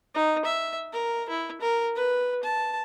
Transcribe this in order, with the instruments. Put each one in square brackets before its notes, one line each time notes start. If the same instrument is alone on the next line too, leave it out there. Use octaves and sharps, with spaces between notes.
[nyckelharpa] D#4
E5
A#4
E4
A#4
B4
A5